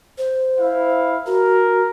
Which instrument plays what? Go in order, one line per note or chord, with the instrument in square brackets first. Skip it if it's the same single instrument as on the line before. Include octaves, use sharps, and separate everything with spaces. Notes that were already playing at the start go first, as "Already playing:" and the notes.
[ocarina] C5
[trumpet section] E4 F5
[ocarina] F#4 [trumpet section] A#4